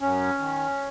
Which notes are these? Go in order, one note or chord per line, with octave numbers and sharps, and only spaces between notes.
F#2 C#4
D#3